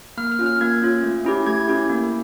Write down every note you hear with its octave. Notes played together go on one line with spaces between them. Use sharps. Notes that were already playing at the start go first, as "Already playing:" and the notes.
A#3 F6
F6
C#4 F4
F6
A#3 G#6
C#4 F4
A3
C#4 E4 G4
A3 G#6
C#4 E4 G4
A#3